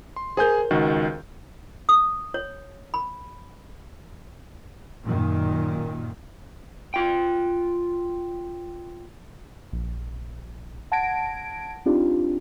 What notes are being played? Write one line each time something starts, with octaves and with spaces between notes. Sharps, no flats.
C6
G#4 A#4 C5 G#5 G6
C#2 D#3 F#4
D#6
C#5
B5
F#2 A#2 D#3
F4 G5
A#1
F#5 A5 G#6 A#6 D7
C4 D4 D#4 F4 G4